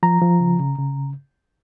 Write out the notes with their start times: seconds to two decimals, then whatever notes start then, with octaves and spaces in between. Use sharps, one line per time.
0.03 F3 A#5
0.22 F3
0.40 C#3
0.60 C#3
0.78 C#3